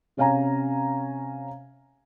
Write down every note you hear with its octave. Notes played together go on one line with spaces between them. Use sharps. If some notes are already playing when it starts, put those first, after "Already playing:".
C3 C#4 F5 G#5 A#5